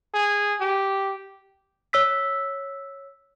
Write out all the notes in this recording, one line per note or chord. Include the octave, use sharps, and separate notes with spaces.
G#4
G4
C#5 E6 B6